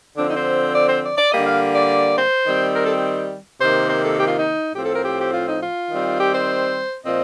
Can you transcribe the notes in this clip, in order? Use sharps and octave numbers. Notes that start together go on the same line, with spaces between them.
D3 F3 C4 D4
D#4
C5
D5
C5
D5
D5
D3 G3 A#3 D#5
F5
D5
C5
D#3 G3 C4
A#4
A4
C3 D#3 A#3 C5
C5
A4
G4
F4
D#4
A2 F3 C4 G4
A4
A#4
G4
G4
F4
D#4
F4
D#3 G3 C4
G4
C5
A#2 F3 C4 D#5